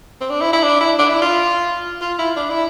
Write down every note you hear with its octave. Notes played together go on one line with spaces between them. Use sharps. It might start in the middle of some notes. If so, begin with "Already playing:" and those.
C4
D4
E4
E4
D4
E4
D4
E4
F4
F4
E4
D4
E4